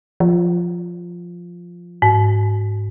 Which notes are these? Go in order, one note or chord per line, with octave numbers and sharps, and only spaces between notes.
F3
G#2